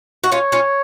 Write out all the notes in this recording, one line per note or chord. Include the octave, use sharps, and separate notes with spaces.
F#4
C#4 F4 C#5
C#4 F4